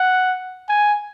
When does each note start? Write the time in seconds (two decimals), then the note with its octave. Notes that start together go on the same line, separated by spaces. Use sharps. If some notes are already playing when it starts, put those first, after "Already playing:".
Already playing: F#5
0.69 G#5